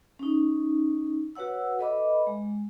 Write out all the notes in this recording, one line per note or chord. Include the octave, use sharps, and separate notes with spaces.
C#4 D#4
F#4 B4 C#5 F#5 E6
A4 B4 D#5 E5 B5 D6
G#3